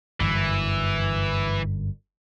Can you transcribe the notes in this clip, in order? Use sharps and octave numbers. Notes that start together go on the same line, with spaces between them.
G1 F#2 E3